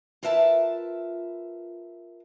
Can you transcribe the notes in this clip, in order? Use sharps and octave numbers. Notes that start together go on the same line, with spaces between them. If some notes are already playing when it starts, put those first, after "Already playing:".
F4 A#4 B4 E5 G5 A5